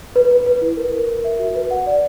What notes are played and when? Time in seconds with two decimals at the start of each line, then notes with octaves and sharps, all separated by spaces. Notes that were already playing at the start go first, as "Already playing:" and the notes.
0.16 B4
0.31 B4
0.46 B4
0.61 E4
0.77 A#4
0.93 A#4
1.09 A#4
1.24 E5
1.39 F#4
1.55 B4
1.71 F#5
1.87 D5